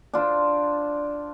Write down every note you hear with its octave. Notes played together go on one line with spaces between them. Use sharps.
D4 F4 C5